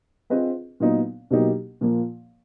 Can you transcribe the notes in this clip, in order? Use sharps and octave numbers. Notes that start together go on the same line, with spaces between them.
C4 F4 G#4 B4 D#5
A#2 F#3 B3 D#4
B2 F#3 A#3 D#4 G4
A#2 F3 A#3